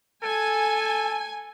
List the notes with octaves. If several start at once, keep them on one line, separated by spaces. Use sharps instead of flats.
A4 G#5